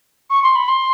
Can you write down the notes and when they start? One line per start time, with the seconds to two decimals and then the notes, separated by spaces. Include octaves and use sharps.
0.30 C#6
0.43 C6
0.55 B5
0.68 C6